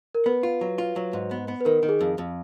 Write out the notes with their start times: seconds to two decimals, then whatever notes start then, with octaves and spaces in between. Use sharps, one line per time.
0.15 A#4
0.26 B3 B4
0.43 F4
0.61 F#3
0.78 F4
0.96 F#3
1.13 G#2
1.31 B3
1.48 B3
1.61 B4
1.65 D#3 A#4
1.83 D#3
1.89 G#4
2.01 F2
2.18 F2